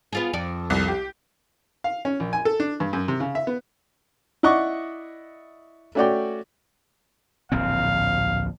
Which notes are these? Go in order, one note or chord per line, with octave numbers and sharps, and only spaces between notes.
B3 F4 G#4
F2 D5
C2
G4
F5
C#4
A#1
G#5
A4
D4
G2
F#2
C3
C#3
E5
B3
E4 D5 D#5 F#5 C#6 D6
A3 C#4 F#4 C#5 D5 G5
D1 A#1 C4 F5